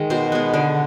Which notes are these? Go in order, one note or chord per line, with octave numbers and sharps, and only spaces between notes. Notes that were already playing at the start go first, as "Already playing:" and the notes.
Already playing: D#3 G#3
B2 C5
G#3 B3
D3